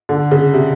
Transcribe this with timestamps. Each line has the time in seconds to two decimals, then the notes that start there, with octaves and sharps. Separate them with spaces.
0.09 D3
0.31 C#3
0.53 C3